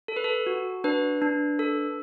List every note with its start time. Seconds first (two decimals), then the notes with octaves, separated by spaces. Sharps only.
0.08 A4
0.16 B4
0.24 A4
0.46 F#4
0.84 D4 B4
1.22 D4
1.59 A4